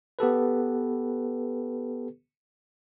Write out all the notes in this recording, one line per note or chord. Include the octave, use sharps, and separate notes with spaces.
B3 G4 A4 B4